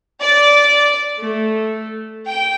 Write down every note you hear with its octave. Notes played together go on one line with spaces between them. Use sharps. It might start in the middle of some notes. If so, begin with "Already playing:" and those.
D5
A3
G5